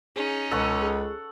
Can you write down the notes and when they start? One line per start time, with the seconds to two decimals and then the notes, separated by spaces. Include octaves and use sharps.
0.16 C#4 D#4 G#4
0.51 C#2 B2 A4 F#5 A5 C#6
0.81 G#4